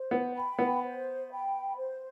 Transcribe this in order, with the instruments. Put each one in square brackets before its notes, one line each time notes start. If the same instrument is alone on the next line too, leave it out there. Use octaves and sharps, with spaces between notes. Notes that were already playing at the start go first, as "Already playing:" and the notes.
Already playing: [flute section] C5
[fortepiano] B3
[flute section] G5 B5
[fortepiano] B3
[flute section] C5
G5 B5
C5